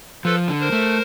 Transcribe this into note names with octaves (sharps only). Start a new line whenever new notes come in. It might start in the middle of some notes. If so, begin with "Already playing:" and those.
F3 A4 B4
D3
A#4 C5
A3